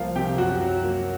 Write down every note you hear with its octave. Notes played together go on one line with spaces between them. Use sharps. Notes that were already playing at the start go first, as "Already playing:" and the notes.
Already playing: C2 F3 A#3 F4 F5
C3 G4 G5
F#2 F#4 F#5
F#3
A#3